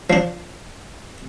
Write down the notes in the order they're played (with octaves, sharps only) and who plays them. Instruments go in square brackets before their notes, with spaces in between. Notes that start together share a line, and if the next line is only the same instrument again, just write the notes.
[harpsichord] F3 D4